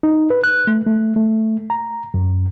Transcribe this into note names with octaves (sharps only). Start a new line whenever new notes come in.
D#4
B4
F#6
A3
A3
A3
A#5
F#2